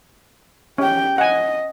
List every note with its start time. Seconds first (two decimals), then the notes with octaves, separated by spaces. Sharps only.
0.78 C#4 G4 G5
1.18 D#5 F#5 G#5